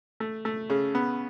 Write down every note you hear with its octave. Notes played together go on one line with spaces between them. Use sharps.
A3
A3
C#3
B3